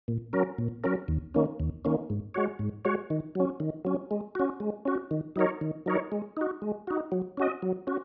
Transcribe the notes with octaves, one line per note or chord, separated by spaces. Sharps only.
A#2
F#3 C#4 A#4
A#2
F#3 C#4 A#4
D#2
D#3 A#3 C#4
D#2
D#3 A#3 C#4
G#2
G#3 F#4 C#5
G#2
G#3 F#4 C#5
D#3
F#3 C#4
D#3
F#3 C#4
G#3
C#4 F#4
G#3
C#4 F#4
D#3
F#3 D#4 A#4 C#5
D#3
F#3 D#4 A#4 C#5
G#3
D#4 F#4
G#3
D#4 F#4
F#3
C#4 F#4 D#5
F#3
C#4 F#4